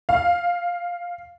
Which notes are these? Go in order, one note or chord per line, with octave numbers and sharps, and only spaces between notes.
F5